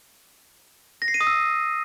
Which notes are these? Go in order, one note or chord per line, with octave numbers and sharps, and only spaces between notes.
A#6
C7
D#7
D#6
E6